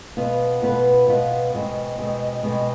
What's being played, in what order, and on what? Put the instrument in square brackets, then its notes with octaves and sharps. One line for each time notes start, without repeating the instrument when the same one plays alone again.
[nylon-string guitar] B2 B3 F4 B4
B2 B3 F4 B4
B2 B3 F4 B4
B2 G#3 C4
B2 G#3 C4
B2 G#3 C4